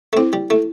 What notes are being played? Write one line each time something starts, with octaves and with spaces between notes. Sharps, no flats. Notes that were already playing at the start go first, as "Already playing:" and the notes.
A3
C4 E4
G3
A3 E4